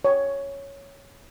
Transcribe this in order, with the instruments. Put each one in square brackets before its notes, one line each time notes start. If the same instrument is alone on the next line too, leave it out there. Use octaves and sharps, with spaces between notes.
[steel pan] C#5